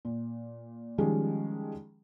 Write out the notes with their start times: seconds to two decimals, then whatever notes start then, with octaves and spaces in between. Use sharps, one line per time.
0.05 A#2
0.98 D#3 F3 G3 G#3 C#4